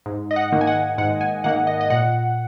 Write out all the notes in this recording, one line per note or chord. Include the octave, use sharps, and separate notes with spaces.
G#2
D#5
F#5
D#3 A#3
G#5
F#5
G#2 F#5
G#5
D#3 A#3 F#5
D#5
D#5
A#2 F#5